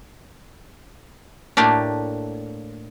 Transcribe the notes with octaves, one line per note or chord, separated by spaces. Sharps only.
A2 A3 A#3 D4 G4